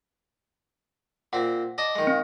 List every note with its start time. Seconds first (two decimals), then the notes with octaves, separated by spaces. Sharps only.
1.33 A#2 C4 F#5
1.78 D5 D#5 A5
1.95 D#3 G#3
2.07 C4